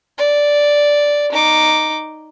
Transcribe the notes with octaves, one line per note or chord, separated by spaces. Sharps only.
D5
D#4 D6